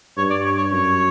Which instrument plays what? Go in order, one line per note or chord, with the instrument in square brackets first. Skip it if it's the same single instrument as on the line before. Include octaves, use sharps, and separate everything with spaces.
[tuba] G2 [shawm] C#5
[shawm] D5
C#5
C#5
[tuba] F#2 [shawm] C#5